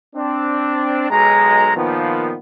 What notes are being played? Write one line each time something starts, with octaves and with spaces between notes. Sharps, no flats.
C4 D4
B1 G#3 A#5
A#2 D#3 F3 B3